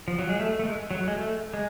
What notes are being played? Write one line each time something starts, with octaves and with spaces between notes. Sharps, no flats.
F3
F#3
G#3
A3
A3
G#3
F#3
G#3
A3
G#3